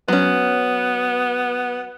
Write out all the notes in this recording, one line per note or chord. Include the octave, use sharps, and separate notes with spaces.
F#3 B3 C#4